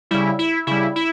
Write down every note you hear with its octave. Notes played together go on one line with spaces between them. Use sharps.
C#3 G3 E4
E4
C#3 G3 E4
E4